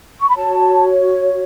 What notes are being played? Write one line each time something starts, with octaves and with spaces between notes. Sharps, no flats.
C#6
B5
F#4 C#5 A5